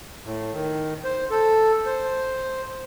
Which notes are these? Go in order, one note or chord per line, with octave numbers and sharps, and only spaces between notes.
A2
D#3
C5
A4
C5